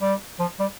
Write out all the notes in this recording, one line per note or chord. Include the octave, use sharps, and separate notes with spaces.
G3
F3
G3